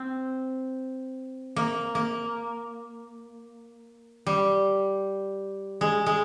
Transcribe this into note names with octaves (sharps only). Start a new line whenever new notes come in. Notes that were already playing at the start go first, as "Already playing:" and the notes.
Already playing: C4
A#3
A#3
G3
G#3
G#3